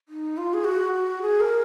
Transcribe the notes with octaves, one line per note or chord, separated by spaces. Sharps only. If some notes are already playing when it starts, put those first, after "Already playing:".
D#4
F4
G#4
F#4
F#4
G#4
A#4